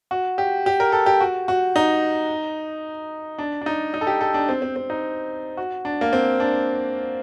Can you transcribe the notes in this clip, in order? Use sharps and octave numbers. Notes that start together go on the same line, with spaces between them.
F#4
G4
G4
A#4
A4
G4
F#4
F#4
D#4
D4
D4
D#4
D#4
A4
G4
A4
D4
C4
C4
C4
D#4
F#4
D4
A#3
C4
D4